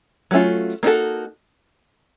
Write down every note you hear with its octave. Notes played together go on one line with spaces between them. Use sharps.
F#3 A3 C#4 F4
A#3 D#4 F#4 A4